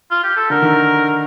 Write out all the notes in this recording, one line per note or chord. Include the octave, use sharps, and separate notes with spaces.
F4
G4
A4
D3 A#4
D#3